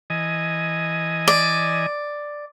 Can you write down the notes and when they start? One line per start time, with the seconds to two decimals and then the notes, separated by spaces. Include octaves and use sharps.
0.10 E3 D#5 G#5
1.28 D5